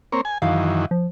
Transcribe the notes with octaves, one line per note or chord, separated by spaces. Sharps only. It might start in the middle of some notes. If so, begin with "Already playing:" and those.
A#3 C4 C#5
G#5
F#2 D#3 E3 F5
F3